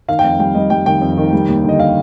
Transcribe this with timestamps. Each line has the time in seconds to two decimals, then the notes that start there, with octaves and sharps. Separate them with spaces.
0.08 D#3 F5
0.19 F2 G5
0.39 G3 G5
0.55 G3 D#5
0.70 G3 G5
0.86 D#3 G5
1.01 F2
1.17 D#3
1.33 G3
1.48 D#2
1.64 D3 D#5
1.79 F5